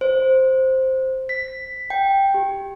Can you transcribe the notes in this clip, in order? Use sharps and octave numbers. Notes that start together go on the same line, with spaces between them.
C5
B6
G5
G4